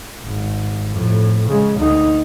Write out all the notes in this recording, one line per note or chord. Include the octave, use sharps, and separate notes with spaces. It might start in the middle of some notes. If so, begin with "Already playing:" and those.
G#1
F2 A2
C#3 G#3
D2 D#4